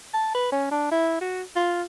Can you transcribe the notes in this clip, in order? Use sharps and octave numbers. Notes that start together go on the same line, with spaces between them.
A5
B4
C#4
D4
E4
F#4
F4